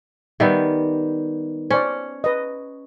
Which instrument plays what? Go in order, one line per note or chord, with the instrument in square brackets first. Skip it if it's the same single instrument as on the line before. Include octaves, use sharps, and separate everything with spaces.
[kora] D#3 G3 B3 [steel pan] E5
[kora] C#4 [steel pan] C5 D5
[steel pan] B4 D#5